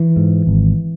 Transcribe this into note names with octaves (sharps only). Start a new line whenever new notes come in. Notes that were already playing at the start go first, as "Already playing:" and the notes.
Already playing: E3
G#2
G#1